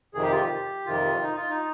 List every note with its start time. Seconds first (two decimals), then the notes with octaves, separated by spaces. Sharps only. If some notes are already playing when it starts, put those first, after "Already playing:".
0.14 F2 C3 D#3 G#4
0.23 G4
0.32 F4
0.41 G4
0.86 F2 C3 D#3 F4
1.22 D#4
1.37 F4
1.50 D#4